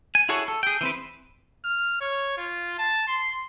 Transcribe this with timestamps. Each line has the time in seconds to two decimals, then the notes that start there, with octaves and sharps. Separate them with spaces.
0.15 G#5
0.29 E4 F#4 G#4 A4 C#5
0.48 A4
0.63 G#4 G5
0.81 E3 C4 B4
1.65 F6
2.01 C#5
2.38 F4
2.79 A5
3.08 C6